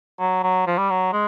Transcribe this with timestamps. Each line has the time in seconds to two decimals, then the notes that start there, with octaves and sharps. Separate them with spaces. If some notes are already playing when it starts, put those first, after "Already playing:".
0.20 F#3
0.43 F#3
0.67 F3
0.78 G3
0.90 F#3
1.13 G#3